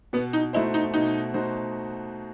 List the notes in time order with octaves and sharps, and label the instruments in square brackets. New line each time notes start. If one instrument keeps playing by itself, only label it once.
[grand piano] B2 [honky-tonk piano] B3
[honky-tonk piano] D#4
[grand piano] A3 D#4 F#4 C5 [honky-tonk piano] E4
[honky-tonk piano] D#4
[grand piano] B2 [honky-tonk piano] D#4
[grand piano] A3 D#4 F#4 C5